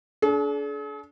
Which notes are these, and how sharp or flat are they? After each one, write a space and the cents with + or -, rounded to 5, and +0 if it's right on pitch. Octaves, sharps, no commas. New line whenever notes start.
D4 -30 G#4 +45